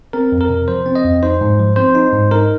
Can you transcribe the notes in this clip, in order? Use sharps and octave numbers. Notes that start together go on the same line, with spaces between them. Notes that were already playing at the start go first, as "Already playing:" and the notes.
C4 A#4
F2
A#4
C3
F3 C5
C4
D#5
F2
D#4 C5
G#2
F3
C4 C5
D#4
G#2
D#4 A#4